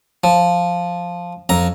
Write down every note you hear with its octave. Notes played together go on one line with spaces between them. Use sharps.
F3
F2 A#5